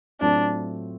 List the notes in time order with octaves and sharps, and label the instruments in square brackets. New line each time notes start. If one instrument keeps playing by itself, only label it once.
[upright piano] A2 F#3 A3 C4 F4 [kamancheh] D4